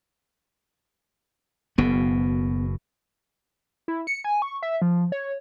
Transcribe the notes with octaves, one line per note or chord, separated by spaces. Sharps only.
F#1 B2 B3
E4
C#7
G#5
C#6
E5
F3
C#5